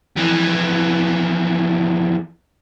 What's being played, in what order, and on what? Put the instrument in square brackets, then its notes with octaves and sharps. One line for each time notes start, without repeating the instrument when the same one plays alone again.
[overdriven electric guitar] F2 E3